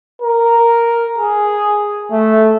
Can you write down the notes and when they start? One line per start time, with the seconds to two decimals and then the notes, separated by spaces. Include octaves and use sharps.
0.22 A#4
1.18 G#4
2.12 A3